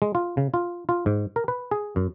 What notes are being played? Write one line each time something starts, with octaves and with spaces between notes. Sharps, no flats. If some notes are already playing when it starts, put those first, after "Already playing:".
G#3
F4
C#3
F4
F4
G#2
A#4
B4
G#4
F#2